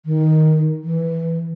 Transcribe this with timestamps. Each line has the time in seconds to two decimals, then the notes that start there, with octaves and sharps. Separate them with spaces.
0.06 D#3
0.84 E3